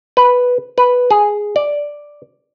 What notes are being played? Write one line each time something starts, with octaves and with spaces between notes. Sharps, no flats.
B4
B4
G#4
D5